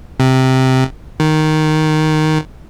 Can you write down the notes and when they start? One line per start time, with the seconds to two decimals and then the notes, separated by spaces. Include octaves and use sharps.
0.20 C3
1.20 D#3